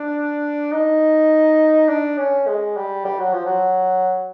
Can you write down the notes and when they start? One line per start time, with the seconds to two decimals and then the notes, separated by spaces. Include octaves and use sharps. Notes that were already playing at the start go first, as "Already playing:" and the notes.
Already playing: D4
0.72 D#4
1.89 D4
2.18 C#4
2.48 G#3
2.77 G3
3.05 G3
3.19 F#3
3.33 F3
3.46 F#3